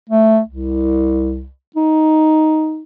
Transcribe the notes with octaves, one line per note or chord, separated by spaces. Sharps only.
A3
C2
D#4